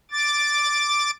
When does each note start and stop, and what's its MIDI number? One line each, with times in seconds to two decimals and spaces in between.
0.11 1.11 86
0.11 1.11 93